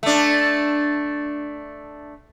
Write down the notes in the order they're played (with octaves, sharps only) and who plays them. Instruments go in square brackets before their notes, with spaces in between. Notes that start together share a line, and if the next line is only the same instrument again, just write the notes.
[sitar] A3 D4